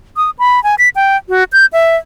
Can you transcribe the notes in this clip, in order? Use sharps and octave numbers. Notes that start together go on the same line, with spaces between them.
D#6
B5
G#5
B6
G5
F#4
G6
E5